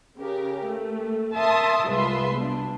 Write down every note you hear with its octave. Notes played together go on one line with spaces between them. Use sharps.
C#3 G4 A#4
A3
A#4 E5 A5 C6 D#6
C2 G#3 F4 B4 E5 C6
B2 D4